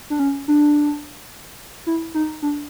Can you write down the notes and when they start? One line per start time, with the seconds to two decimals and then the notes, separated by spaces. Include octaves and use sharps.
0.10 D4
0.19 C#4
0.48 D4
1.86 E4
2.14 D#4
2.42 D4